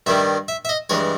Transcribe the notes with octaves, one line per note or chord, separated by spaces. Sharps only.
G2 D#3 G3 E5
E5
E5
D#5
G2 E3 G#3 C#5